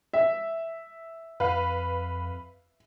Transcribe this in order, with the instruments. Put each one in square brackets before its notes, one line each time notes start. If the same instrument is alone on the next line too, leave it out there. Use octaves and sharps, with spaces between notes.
[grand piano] E5
[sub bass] F2 [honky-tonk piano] B4 F5